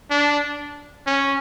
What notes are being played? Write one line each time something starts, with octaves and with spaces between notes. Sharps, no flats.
D4
C#4